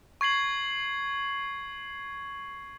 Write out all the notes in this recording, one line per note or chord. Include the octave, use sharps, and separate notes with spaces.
C#6 G#6 C7 F#7